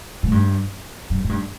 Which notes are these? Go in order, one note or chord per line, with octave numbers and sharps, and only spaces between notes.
A2
G2
G2
A2
G2